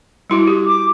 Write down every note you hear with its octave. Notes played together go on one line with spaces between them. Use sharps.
G3 E4 F#4
G4
D6